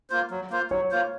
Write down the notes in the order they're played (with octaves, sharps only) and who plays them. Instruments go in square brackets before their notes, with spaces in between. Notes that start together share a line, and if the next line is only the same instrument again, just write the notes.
[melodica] A#3 F4 C5
F#3
A#3 F4 C5
[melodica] F#3 [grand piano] C#5
[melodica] A#3 F4 C5